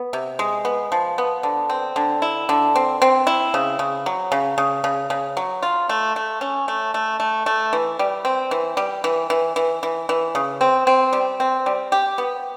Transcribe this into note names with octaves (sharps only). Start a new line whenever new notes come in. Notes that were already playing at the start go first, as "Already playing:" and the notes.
Already playing: B3
C3
G#3
B3
F3
B3
D3
C4
D3
E4
D3
C4
C4
E4
C#3
C#3
F#3
C#3
C#3
C#3
C#3
F#3
F4
A3
A3
C#4
A3
A3
A3
A3
E3
G3
C4
E3
G3
E3
E3
E3
E3
E3
C#3
C4
C4
G3
C4
G3
G4
B3